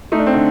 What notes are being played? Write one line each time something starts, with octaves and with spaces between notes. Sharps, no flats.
A3 D#4
D4
C4
D3 D4